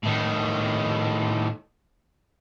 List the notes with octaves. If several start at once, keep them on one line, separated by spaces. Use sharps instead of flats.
A2 D#3